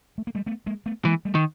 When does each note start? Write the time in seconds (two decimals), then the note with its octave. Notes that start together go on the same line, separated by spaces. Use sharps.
0.18 A3
0.27 A#3
0.35 G3 A3
0.46 A3 B3
0.66 G#3 A#3
0.86 A3 B3
1.05 E3 G#3 A#3
1.25 G3 A3
1.35 D#3